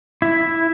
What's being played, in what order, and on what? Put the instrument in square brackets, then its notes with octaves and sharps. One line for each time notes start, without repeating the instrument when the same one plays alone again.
[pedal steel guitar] E4